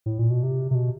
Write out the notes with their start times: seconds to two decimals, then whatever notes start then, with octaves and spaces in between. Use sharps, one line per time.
0.06 A2
0.19 A#2
0.30 B2
0.43 C3
0.71 C3
0.75 B2